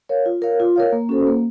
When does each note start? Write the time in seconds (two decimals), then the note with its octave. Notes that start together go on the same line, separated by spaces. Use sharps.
0.09 A#4 C#5 F5
0.26 F4
0.42 A#4 C#5 F5
0.60 F4
0.76 A#4 C#5 F5
0.92 A#3
1.09 C#4 F#4 A4 C5
1.27 A#3